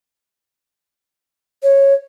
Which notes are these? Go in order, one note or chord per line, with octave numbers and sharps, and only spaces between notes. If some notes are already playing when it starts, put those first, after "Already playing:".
C#5